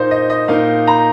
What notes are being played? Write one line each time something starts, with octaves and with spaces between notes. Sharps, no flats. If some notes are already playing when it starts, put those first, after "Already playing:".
Already playing: A#2 A#3 D#4 C5
D#5
D#5
A#2 A#3 D#4 F5
A#5